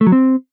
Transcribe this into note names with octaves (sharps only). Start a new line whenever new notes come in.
A3
F#3
C4